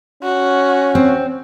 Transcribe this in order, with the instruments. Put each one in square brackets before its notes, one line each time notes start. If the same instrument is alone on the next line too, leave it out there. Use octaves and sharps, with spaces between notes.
[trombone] C#4 [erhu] F#4
[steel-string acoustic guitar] C4